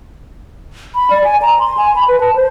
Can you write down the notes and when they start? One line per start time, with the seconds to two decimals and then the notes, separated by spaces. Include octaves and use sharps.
0.95 B5
1.10 D5
1.24 G#5
1.42 A#5
1.59 C6
1.77 G#5
1.96 B5
2.08 B4
2.21 A5
2.35 C5